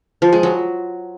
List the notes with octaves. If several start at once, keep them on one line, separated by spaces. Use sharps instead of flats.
F3
G#3
F#3